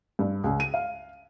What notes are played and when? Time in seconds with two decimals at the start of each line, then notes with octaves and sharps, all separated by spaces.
0.19 G2
0.44 C#2
0.60 D#7
0.74 F5